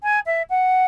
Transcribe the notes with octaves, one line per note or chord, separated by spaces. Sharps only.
G#5
E5
F#5